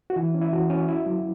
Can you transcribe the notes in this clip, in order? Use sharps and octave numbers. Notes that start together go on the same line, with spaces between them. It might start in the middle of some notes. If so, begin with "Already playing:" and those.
F#4
E3 E4
C#4
E4
E3 F#4
C#4
E4
F#3